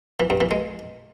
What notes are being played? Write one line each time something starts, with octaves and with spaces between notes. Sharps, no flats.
E3
G2
E3
G#3